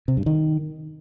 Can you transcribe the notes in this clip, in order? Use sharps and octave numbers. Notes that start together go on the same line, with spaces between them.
C3
G2
D#3